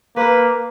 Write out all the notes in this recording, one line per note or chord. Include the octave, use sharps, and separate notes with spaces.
A#3 B4